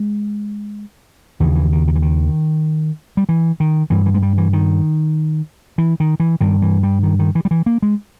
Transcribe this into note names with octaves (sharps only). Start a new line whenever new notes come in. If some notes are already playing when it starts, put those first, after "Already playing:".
Already playing: G#3
D#2 C#3 E3
E3
D#3
D#3
E3
D#3
G3
E3
D#3
G2 E3
E3
G#3
G3
E3
D#3
E3
D#3
E3
G2 D#3
E3
G3
D#3
D#3
E3
G3
E3
A#3
G#3